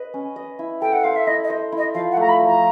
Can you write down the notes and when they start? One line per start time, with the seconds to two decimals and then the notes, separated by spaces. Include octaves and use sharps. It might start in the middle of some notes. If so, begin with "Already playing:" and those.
Already playing: B4 D#5
0.14 C#4
0.36 D#5
0.59 E4
0.81 A4 G5
0.93 F#5
1.04 C5 F5
1.16 E5
1.27 E4 D#5
1.44 D#5
1.50 C5
1.72 E4
1.78 D#5
1.94 F3 F5
2.12 F#5
2.17 A3 A#5
2.29 B5
2.40 F3
2.46 A#5